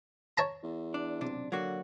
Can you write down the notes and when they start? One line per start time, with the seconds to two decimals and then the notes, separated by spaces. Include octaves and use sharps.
0.38 C#5 A5 A#5
0.63 E2
0.94 D4
1.21 B1 C3 D4
1.52 D3 F#3 A#3 F#4